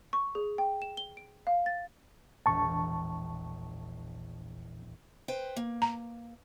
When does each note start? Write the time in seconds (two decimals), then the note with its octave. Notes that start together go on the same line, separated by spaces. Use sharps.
0.13 C#6
0.35 G#4
0.58 G5
0.82 E7
0.97 G7
1.17 D7
1.47 F5
1.66 A6
2.46 E1 A#1 A5 C#6
5.28 B4 C5 G5
5.56 A#3
5.82 A#5